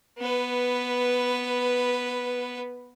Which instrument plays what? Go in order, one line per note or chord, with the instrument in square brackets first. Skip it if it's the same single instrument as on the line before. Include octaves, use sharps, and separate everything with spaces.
[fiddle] B3 B4